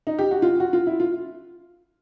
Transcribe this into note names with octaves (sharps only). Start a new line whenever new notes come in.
D#4
G4
F#4
F4
F#4
F4
E4
F4